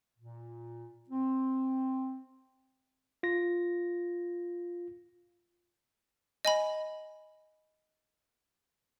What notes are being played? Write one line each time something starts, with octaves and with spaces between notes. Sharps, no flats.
A#2
C4
F4 A#6
D#5 G#5 B5